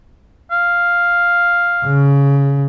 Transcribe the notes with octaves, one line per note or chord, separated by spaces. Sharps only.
F5
C#3